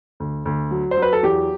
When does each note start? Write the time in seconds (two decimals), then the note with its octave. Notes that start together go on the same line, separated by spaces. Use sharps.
0.20 D2
0.45 D2
0.71 F#3
0.91 C5
0.97 F#3
1.02 B4
1.13 A4
1.23 E2 G4